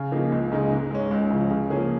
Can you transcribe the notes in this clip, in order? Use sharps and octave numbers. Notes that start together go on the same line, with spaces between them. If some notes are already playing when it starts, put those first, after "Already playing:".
Already playing: C#3
F3 A#3 D#4 G#4
C#2
C#3 G#3 D#4
G#2
G#3 C#4
C#2
C#3 F3
C#3
F3 A#3 C#4 G#4